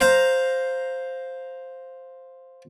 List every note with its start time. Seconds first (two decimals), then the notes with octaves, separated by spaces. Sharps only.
0.01 C5 F5 A#5